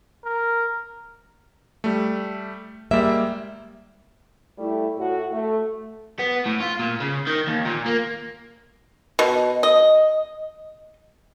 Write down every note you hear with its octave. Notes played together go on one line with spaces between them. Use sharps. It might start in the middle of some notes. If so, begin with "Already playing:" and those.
A#4
G3 A3
G3 G#3 A#3 E5
G3 A3 E4
A2 F#4
A3
B3
A2
F4
A#2
C#3
D#3
D#2
A#2
A#3
B2
D#5